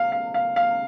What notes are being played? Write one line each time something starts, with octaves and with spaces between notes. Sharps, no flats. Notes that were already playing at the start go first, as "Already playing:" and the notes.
Already playing: F5
F5
F5
F5